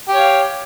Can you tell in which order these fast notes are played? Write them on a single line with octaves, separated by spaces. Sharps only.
G4 C#5 F5